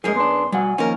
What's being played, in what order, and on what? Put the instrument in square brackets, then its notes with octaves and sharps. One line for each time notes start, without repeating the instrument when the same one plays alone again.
[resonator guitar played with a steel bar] F#2 G#4 [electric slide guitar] F3 G#3 [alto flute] A#4
[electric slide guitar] B3 D4 [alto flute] C6
[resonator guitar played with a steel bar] B2 [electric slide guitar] G3 F#4 F#5 [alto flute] G#5
[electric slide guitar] D#3 F3 A#3 [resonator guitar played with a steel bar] C#4 A#4